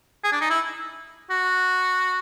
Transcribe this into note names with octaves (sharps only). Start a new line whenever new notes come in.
G#4
D4
D#4
E4
F#4